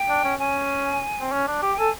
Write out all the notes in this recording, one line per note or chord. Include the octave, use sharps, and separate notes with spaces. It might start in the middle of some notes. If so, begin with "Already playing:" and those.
Already playing: G5
D4
C#4
C#4 G#5
C4
C#4
D4
G4
G5
A4 G#5